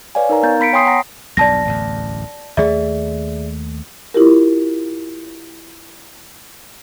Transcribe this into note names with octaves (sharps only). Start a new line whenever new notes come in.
B4 C#5 D5 F5 G#5
D#4 A#4 A#5
B3 F5 A#5 G6 A6
B3 B5 B6 C#7 D7
C#5 G5 G#5 C6 D#6 C7
F#5 A#5 A#6
B1 E2 G2 D5 A5 A#6
D1 A1 E2
D#2 A3 G#4 D5 E5
E4 F4 G4 A#4